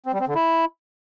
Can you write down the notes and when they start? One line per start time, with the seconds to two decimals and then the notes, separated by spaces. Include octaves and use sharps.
0.06 C4
0.13 G3
0.21 C4
0.28 D3
0.35 E4